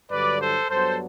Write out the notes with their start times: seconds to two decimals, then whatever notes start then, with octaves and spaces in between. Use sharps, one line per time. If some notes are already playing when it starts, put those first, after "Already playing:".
0.11 G2 D3 F#3 B4 D5
0.40 A4 C5
0.69 G2 F#3 B3 D4 A4 C5